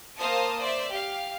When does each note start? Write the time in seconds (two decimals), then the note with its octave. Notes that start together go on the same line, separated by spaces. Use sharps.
0.19 A#3 C5 F5 A5 D#6
0.59 C5 D5 E5
0.93 G4 F5